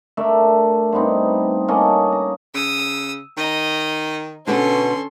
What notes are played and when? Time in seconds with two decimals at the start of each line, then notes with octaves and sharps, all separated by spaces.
0.17 A3 D4 A#4 E5
0.92 G2 B3 C4 D#4
1.68 A#3 C#4 A4 D#5
2.12 A#5
2.54 C#3 D#6 E6
3.37 D#3 D#4 D#5
4.47 B2 D3 B3 C#4 A4 C6